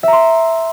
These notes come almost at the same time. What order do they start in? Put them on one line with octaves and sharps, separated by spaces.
E5 A#5 C6